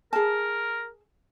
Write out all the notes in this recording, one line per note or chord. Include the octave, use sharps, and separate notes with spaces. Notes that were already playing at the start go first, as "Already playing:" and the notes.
G#4 A#4 A5